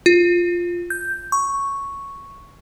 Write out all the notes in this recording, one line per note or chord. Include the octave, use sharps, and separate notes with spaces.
F4
G6
C#6